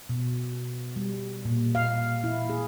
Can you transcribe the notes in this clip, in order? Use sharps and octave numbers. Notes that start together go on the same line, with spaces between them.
B2
G3
A#2
F5
E4
G#4